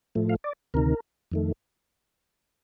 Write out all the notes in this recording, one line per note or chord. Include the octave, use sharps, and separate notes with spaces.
A2 F3 A3
F5
D5
D2 C3 D#3 A#4
F2 D#3 A3